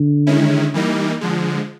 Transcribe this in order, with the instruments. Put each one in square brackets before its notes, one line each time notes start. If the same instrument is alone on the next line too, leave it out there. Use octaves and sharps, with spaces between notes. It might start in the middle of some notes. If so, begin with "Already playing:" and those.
Already playing: [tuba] D3
[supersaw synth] D#3 G#3 C#4 E4
E3 G3 A#3 D#4
D3 F3 G#3